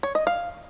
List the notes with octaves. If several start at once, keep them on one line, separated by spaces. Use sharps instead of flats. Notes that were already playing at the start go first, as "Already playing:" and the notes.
C#5
D#5
F5